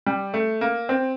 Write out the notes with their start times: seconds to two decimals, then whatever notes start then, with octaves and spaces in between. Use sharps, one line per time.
0.06 G3
0.34 A3
0.61 A#3
0.89 C4